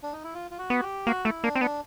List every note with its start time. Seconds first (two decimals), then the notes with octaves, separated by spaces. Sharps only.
0.03 D4
0.13 D#4
0.24 E4
0.34 F4
0.51 F4
0.58 F#4
0.70 B3
0.82 G4
1.07 A#3 F#4
1.25 A3 E4
1.43 A#3 D4
1.55 C4
1.61 B3 D4